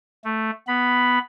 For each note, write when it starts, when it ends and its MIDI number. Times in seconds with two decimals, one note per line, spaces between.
0.24 0.51 57
0.67 1.19 59
0.67 1.19 83